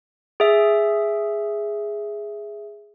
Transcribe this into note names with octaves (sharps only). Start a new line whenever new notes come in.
G#4 E5